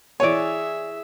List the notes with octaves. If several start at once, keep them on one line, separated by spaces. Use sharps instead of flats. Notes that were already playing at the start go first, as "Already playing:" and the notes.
E3 G#4 C#5 D5 E5 G#5